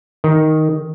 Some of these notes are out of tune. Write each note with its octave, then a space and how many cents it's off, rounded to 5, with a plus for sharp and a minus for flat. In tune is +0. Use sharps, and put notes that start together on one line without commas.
D#3 +5